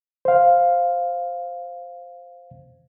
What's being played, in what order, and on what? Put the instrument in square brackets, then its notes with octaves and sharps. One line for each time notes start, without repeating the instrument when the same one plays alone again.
[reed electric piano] C5 F5